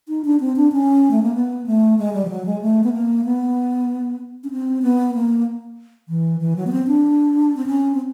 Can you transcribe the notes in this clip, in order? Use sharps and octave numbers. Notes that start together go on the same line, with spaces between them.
D#4
D4
C4
D4
C#4
A3
A#3
B3
A3
G#3
G3
F3
F#3
G#3
A3
B3
A#3
B3
C#4
C4
B3
A#3
E3
E3
F#3
B3
C4
D4
C4
C#4
C4